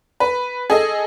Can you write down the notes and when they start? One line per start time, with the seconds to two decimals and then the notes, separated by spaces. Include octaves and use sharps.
0.20 B4
0.70 G#4 A4 D#5